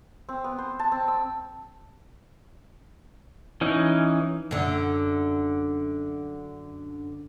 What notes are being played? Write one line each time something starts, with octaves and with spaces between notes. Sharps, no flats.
C4
B3
C5
A5
C4
E6
E3 C#4 D#4
F#2 D3